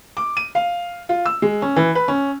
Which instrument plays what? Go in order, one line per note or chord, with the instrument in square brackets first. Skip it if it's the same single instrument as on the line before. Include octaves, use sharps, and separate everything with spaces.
[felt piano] D6
D#7
F5
F4
E6
G#3
C#4
E3
B4
C#4